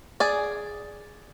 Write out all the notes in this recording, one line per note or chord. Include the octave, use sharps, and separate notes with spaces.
G#4 D5